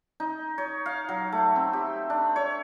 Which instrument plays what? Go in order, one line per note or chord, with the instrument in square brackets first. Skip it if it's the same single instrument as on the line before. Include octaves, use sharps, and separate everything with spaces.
[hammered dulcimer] D#4
C#5
F5
F#3
A3
C4
G4
D4
C#5